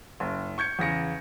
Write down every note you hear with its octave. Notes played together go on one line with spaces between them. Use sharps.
F#1
C#6 G6 G#6 C#7
E2 C#3 A#6 C#7